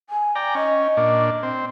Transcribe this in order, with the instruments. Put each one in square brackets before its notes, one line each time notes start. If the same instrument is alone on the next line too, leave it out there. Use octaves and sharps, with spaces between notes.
[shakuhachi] G#5
[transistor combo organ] D5 G5 A#5
[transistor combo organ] C#4 [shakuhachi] D#5
[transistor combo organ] A#2 D4
C4